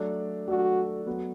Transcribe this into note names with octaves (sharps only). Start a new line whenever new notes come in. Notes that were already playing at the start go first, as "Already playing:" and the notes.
Already playing: F#3 A3 D4 A4 D5
F#3 A3 D4 F#4 A4 D5
F#3 B3 F#4